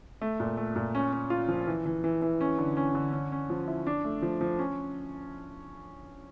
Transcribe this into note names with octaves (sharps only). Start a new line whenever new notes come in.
A3
A#2
A3
A#2
C#4
C#4
F4
F3
E3
E3
E3
E3
C#4
D3
C#4
D3
C#4
C#4
F3
E4
D4
A3
F3
F3
C#4